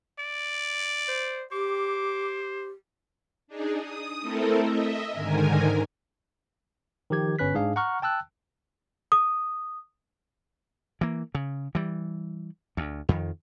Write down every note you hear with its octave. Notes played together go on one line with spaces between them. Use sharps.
D5
C5
G4 C5 D6
D4 D#4 G#4
D#6
A3 C4 E4 A4 A#4
D#5 E5
G#2 D3 D#3 A#4 G#5
D#3 F3 G4 G#6
G1 C#4 B4 F#6 B6
G#2 D4 G#4 F5
F#5 A#5 C#6 F6
G5 A5 E6 F#6
D#6
E3 A#3
C#3
E3 G3
D2
F2 D#3